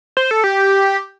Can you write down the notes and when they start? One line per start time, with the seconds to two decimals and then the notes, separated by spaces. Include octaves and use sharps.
0.17 C5
0.31 A4
0.44 G4